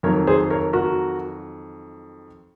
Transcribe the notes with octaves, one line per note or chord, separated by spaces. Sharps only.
F2 D#3 F#3 A#4 C#5
G#4 C5
A#4 C#5
F#4 A#4